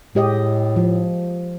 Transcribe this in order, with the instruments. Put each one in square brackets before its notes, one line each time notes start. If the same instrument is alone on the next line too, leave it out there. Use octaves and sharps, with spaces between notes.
[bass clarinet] A2 [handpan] G#3 G4 D#5
[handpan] F3